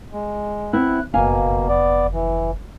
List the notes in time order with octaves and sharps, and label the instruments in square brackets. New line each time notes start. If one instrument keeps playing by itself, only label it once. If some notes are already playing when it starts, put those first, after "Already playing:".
[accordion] G#3
[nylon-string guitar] B3 C4 E4 [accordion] F#6
[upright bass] F#1 F2 [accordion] B2 A#3 [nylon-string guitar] F5 G#5
[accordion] B3 D5
E3